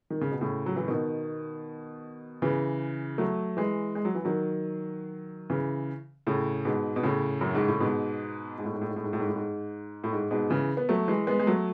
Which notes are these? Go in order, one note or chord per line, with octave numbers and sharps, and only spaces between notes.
D#3
C#3
B2
A2 C#3
F#3
E3
B2 D#3
C#3 E3
F#3 A3
E3 G#3
G#3
F#3
E3
D#3 F#3
C#3 E3
A2 C#3
G#2 B2
B2
A2 C#3
F#2
G#2
A2
G#2 B2
G#2
A2
G#2
A2
G#2
A2
G#2
A2
G#2
A2
G#2
A2
G#2
G#2 B2
C#3 E3
B3
F#3 A3
E3 G#3
G#3 B3
G#3
F#3 A3